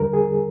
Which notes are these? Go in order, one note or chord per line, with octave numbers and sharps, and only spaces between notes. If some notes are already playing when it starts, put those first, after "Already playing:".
Already playing: F2 D3 G3 A#4
G#4